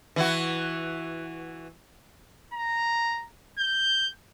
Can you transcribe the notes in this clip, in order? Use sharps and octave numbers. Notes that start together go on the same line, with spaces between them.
E3 E4 F#4
A#5
G6